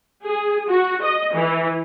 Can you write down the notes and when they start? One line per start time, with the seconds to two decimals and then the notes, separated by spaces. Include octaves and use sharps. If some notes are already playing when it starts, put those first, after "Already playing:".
0.24 G#4
0.69 F#4
1.03 D#5
1.34 E3